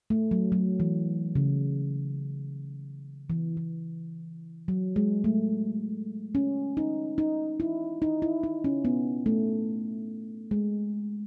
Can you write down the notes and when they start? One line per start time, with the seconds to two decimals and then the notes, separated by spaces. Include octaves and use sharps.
0.10 A3
0.31 F#3
0.52 F#3
0.80 E3
1.35 C#3
3.30 E3
3.57 E3
4.68 F#3
4.96 G#3
5.24 A3
6.35 C#4
6.77 D#4
7.18 D#4
7.60 E4
8.02 D#4
8.22 E4
8.43 D#4
8.64 C#4
8.85 B3
9.26 A3
10.51 G#3